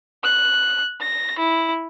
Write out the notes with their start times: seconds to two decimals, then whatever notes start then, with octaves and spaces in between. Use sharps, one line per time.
0.24 F#6
1.01 A#6
1.39 E4